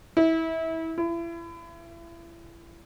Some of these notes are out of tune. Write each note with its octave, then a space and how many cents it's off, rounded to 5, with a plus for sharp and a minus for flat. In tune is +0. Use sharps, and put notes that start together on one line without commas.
E4 -25
E4 +35